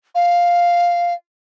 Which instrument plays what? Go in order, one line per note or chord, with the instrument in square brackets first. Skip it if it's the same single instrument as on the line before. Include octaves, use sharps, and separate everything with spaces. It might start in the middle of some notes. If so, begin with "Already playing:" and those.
[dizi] F5